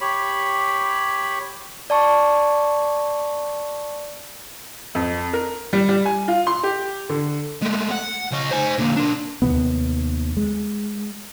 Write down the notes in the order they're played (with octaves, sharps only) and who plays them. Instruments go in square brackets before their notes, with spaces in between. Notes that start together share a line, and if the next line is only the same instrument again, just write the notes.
[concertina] G4 C#5 B5
[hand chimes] D5 A5 C#6
[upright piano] F2
A#4
G3
G3
G#5
F4
C6
G4
D3
[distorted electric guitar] G#3 A3
F#5
C#3 D#5
C5 G#5
D3 A#3
D4 A#4
[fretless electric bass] D#2 G#2 C3 B3
G#3